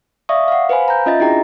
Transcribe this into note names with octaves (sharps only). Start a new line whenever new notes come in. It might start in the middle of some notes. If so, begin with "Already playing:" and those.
D5 E5 F5 C#6 D#6
F5 F#5
B4 C5 F5 G#5 B5
A#5 G6
C#4 F4 D#5 E5 A6
D4 E4 F#4 G#4 G5 A#5